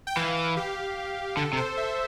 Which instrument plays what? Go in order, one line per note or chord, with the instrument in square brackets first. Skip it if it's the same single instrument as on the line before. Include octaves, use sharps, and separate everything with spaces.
[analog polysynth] G5
[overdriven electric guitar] E3 [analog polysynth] F5
[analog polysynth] F5
G4
[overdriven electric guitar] D3 [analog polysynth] A4
[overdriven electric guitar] C3
[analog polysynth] C5
E5